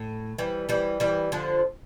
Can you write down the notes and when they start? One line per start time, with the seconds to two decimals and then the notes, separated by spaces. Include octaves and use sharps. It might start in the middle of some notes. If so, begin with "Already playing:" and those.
Already playing: A2
0.38 E3 G3
0.69 E3 G3
1.00 E3 G3
1.32 D3 F3